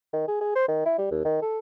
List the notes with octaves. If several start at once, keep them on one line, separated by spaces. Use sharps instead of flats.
D#3
G#4
G#4
C5
D#3
E4
G3
D#2
D#3
A4